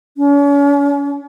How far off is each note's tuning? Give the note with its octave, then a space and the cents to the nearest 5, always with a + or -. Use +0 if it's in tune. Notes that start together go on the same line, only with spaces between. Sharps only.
C#4 +40